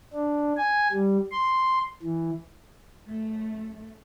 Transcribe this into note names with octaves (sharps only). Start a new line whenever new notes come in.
D4
G#5
G3
C6
E3
F#2 A3